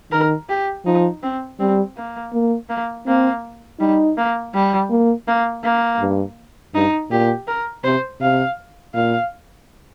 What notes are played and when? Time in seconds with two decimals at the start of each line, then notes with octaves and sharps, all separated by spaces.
0.12 D#3 A#4
0.49 G4
0.85 F3 D#4
1.22 C4
1.59 G3 C4
1.97 A#3
2.33 A#3
2.69 A#3
3.06 A#3 C4
3.80 G3 D#4
4.17 A#3
4.54 G3
4.90 A#3
5.27 A#3
5.64 A#3
6.00 G2
6.74 G2 D#4
7.10 A#2 G4
7.47 A#4
7.84 C3 C5
8.20 C3 F5
8.94 A#2 F5